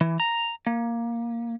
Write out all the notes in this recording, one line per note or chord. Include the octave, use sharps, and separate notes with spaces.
E3
A#5
A#3